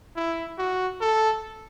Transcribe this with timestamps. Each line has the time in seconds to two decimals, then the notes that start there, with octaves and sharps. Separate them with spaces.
0.16 E4
0.58 F#4
1.01 A4